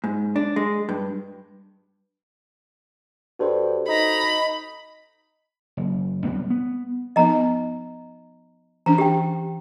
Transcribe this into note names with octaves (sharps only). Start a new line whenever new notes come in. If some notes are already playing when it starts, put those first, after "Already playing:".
G#2
D4
G#3
G2
G2 F#4 A4 C5
D#4 A#5 B5
F#1
B1 F2 G3 B3
B3
F3 B3 D#4 D#5 A#5
E3 C#4 D4 A#5
G4 G5